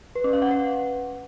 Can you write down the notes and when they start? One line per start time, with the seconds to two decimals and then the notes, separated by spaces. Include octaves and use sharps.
0.15 B4
0.24 C#4
0.33 F5
0.42 F#5
0.51 B4